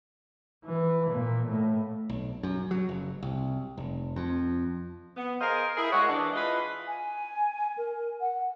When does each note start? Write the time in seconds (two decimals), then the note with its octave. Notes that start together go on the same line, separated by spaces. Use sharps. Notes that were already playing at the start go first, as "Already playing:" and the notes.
0.64 E3
1.10 A#2
1.48 A2
2.10 B1
2.43 F#2
2.71 F#3
2.89 F#1
3.23 C2
3.78 F1
4.16 F2
5.16 B3
5.40 G#4 A#4 C5 D#5 F5
5.77 E4 G#4 A#4
5.92 G#3 F#4 C#5
6.09 E3 D4
6.33 E4 F4 G#4 B4 D#5 E5
6.87 G#5
7.78 A#4
8.21 F#5